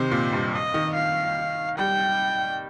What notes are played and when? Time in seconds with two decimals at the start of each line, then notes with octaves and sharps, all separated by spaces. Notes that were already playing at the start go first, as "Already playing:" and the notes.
Already playing: C3 D#3 C5
0.11 A#2
0.33 G2
0.53 D#5
0.74 D#3
0.95 F5
1.77 G3 G5